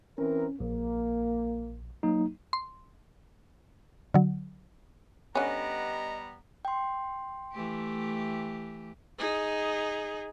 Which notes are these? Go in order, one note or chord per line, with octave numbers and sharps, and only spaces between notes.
E3 C4 C#4 A#4
A#1 A#3
F#3 A#3 D#4
C6
D3 F#3
D3 G3 B3 C#4 D#5 A#5
G5 C6
E3 A3 G4
D#4 G#4